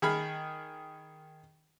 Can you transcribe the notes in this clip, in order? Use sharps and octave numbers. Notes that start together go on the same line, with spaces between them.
D#3 G#4 B5 F6